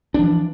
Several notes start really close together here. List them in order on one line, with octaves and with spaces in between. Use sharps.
D4 F3 E3